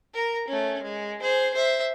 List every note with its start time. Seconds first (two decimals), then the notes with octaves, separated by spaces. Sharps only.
0.14 A#4 A#5
0.48 A3 C#4
0.82 G#3
1.21 G#4 C5
1.54 C5 E5